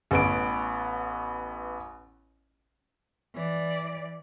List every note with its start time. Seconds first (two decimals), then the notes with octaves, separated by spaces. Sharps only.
0.11 A1 B3 D7
3.35 E3 D5